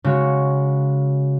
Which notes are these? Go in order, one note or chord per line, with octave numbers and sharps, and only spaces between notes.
C#3 G#3 F#4 C#5